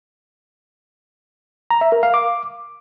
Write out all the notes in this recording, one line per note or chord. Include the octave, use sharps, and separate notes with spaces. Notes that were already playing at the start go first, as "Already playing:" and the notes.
A#5
E5
A#4
F5
D6